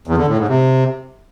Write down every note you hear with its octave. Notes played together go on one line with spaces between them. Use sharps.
E2
D3
A2
G#2
C3